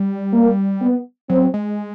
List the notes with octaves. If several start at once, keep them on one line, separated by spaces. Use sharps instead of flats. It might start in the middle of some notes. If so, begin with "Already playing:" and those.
Already playing: G3
A#3
B3
F#3 C4
G#3